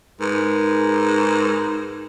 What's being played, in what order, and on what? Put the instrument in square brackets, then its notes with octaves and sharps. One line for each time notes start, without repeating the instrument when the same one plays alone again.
[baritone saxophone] G#2 [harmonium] G#4 A#4 B4